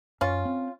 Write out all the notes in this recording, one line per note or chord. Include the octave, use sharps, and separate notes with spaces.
F#2 C#4 F4
C4